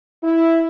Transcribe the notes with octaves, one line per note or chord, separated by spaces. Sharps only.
E4